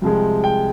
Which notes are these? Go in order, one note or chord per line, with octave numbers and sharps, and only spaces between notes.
C2 C3 F3 G#3
G5